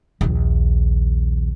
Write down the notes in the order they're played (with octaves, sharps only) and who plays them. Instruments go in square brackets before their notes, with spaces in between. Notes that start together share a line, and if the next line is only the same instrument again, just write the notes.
[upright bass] A#1 D#2